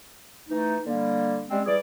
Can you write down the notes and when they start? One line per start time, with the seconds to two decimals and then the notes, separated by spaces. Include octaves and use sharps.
0.49 E3 A3 D#4
0.86 D3 G3 A#3
1.50 G3 G#3 C4 C#4
1.66 E3 G3 G#4 D5